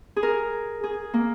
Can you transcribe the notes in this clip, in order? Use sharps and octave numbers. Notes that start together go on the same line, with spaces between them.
G#4
A#4
G#4
A#3